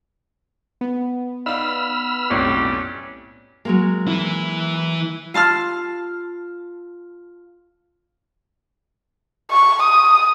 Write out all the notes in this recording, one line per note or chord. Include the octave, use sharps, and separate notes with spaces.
B3
D#4 D5 F5 B5 E6 F6
B1 F2 A2 F#3 G3 C#4
F#3 G#3 A#3
E3 E4
F4 A5 C6 F6
C#6
D#6